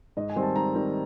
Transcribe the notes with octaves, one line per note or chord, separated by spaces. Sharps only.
G#2 D#5
G#5
D#3 G3 C4
A5
G#2 A#5
D#3 G3 C4